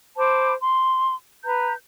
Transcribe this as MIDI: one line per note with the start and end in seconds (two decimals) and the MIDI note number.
0.17 0.53 72
0.17 0.53 81
0.17 0.53 83
0.17 0.53 86
0.61 1.14 84
1.44 1.73 71
1.44 1.73 82
1.44 1.73 91